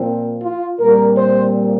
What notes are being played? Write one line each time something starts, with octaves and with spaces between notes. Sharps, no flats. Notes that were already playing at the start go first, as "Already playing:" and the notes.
Already playing: A#2 F3 C4
F4
A#2 G3 C4 A#4
C5